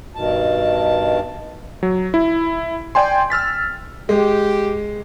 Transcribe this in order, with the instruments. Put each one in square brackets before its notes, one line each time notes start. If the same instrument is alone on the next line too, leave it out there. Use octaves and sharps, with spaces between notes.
[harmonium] G2 B2 D#3 A5
[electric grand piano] F#3
E4
D5 G5 G#5 C6
E6 F6 A6 B6
[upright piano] G#3 [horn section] G4